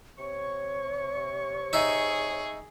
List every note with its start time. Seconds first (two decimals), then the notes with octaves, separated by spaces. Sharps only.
0.18 C3 C#5 C#6
1.73 D#4 G#4 E5